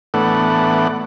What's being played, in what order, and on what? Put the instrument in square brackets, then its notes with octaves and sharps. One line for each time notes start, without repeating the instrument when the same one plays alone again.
[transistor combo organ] A2 E3 A3 B3 D4 F#5